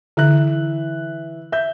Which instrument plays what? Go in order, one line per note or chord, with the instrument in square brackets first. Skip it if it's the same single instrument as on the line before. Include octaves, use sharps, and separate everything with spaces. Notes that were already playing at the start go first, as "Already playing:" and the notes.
[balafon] D3 [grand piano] E3 E5 F#6
[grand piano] E5 G6